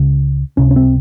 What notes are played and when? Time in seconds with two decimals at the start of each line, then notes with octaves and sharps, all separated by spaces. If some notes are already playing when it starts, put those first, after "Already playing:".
Already playing: C#2 C#3
0.57 C#2 C3 C#4
0.71 C#4
0.76 C4